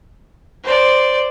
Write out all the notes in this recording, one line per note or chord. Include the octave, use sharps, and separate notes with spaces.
C5 D5